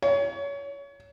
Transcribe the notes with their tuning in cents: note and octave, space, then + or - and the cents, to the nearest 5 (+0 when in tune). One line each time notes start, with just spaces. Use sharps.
C#5 +25